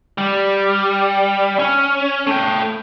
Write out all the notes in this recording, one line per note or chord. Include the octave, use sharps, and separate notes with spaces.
G3
C#4
A3 G5